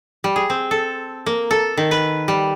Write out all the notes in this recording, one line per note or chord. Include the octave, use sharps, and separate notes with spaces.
G3
G#4
C4
A4
A#3
A4
D#3
B4
G3